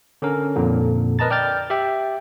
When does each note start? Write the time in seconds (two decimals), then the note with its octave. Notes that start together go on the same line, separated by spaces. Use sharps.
0.22 D3 C#4 A#4
0.56 F2 A#2 D3
1.19 A#4 B4 D#5 A5 A#5 A6
1.30 D5 G5 F6 G6 A6
1.70 G4 E5 G5